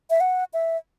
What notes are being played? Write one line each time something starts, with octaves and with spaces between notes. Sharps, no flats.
E5
F#5
E5